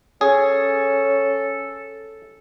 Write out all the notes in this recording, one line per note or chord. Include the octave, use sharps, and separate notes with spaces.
C#4 G#4 A4